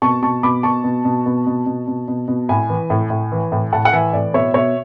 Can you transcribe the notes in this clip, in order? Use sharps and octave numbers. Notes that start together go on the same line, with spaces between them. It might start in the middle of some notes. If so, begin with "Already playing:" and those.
B2 A5 C#6
B2 A5 C#6
B2 B5 D6
B2 A5 C#6
B2
B2
B2
B2
B2
B2
B2
B2
A2 G#5 B5
E3
A2
A2
E3
A2
A2 F#5 A5
F#5
E3 E5 G#5
A2 D5
B2 C#5 E5
B2 C#5 E5